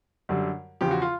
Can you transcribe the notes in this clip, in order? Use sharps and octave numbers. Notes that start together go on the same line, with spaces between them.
F#2 D3 G3
E2 C#3 F3 G4
F#4
F4